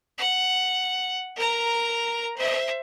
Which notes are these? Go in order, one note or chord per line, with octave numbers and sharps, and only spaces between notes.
F#5
A#4 A#5
C5 E5